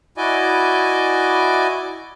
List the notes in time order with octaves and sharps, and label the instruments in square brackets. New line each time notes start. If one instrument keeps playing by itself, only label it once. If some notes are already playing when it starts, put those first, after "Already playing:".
[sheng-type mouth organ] E4 F#4 D5 D#5 G#5 D6